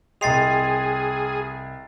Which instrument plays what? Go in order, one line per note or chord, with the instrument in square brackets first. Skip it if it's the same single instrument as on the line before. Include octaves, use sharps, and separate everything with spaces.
[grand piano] C2 D#5 [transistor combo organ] G#4 [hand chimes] G5 C6 [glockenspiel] A6 C7 F7